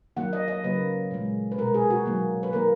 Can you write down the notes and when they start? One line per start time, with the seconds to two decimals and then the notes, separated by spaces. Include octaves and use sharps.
0.17 D#3 F#3 A#3 F#5
0.33 D#5
0.48 D#5
0.64 C#3 F#3 A#3 B4
1.11 A#2 G#3
1.52 B4
1.58 B2 G#3 A#4
1.74 G#4
1.90 F#4
2.06 D#3 F#3 A#3
2.43 B4
2.53 D#3 A#3 A#4